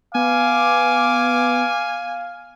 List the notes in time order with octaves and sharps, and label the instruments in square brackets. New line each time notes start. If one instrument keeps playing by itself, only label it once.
[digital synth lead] B3 [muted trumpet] F5 [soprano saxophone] G#5 [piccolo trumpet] D6